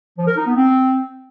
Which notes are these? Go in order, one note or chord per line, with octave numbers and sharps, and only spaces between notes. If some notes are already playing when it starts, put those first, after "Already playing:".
F3
A#4
D#4
B3
C4